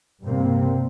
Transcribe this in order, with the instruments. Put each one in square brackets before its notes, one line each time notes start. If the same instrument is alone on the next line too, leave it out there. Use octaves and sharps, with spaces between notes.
[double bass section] G2 C3 G3 A#3 C4